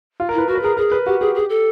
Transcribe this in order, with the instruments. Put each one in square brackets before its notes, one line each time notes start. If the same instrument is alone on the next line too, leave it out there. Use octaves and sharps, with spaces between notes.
[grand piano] F4
A#4
[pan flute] E4 [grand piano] B4
[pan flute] F#4 [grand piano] A#4
[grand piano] B4
[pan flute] G#4 [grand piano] A#4
[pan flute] G#4 [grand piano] A#4
[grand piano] B4
[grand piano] F#4 [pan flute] G4
[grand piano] G4 [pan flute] G#4
[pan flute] G#4
A4